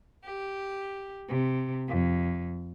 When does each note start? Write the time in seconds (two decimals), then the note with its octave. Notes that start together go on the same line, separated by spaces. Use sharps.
0.24 G4
1.28 C3
1.88 F2